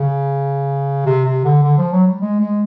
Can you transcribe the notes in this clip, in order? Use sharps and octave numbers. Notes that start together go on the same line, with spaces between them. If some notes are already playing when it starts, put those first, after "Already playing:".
Already playing: C#3
C3
C3
D3
D3
F3
F#3
G3
G#3
G#3